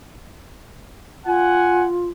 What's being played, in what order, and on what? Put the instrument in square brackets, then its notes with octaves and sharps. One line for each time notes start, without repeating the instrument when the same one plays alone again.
[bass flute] F4 [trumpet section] F#5 G#5